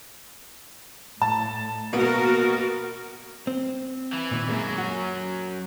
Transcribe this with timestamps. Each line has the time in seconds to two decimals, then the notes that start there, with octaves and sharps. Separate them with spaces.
1.22 A2 A5
1.93 B2 A#3 B3 F#4 A#4
3.47 C4
4.13 E3
4.31 A#2 D#3 B3
4.49 F#2 F#3 G#3 A#3
4.78 F#4